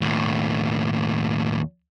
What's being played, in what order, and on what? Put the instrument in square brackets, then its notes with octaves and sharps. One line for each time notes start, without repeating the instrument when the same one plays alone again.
[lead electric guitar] D#2 A2